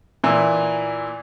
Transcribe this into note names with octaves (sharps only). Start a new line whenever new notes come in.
A#2 E3